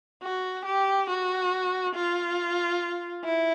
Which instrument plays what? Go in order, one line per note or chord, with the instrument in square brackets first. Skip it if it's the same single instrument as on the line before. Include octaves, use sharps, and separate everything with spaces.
[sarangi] F#4
G4
F#4
F4
E4